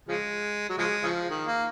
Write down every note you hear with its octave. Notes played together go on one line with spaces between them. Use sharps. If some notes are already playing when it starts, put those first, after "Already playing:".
C#3 F3 G#3
F#3
C#3 F3 G#3
C#3 F3
D#3
A#3